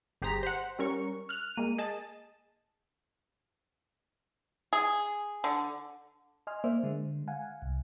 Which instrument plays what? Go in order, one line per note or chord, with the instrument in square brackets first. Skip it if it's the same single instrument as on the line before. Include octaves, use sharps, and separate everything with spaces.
[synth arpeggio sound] G1 G4 G#4 C5 A#5 B6
C5 F#5
G3 C#4 A#4 C#6
F6 F#6
G#3 A#3 D#7
G#4 D#5 A5
[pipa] G#4
D3
[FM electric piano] D#5 G#5 C6 F6
A#3 C5 D5 E5
D3 G#3
F5 F#5 G#5
C2